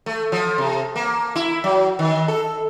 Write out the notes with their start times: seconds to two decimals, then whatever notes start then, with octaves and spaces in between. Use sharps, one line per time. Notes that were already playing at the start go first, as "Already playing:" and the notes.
0.06 A3
0.32 F3
0.58 C3
0.96 A#3
1.36 E4
1.64 F#3
1.99 D#3
2.28 A4